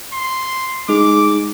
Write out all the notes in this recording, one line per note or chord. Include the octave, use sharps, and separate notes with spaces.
C6
G#3 D#4 G#4 D6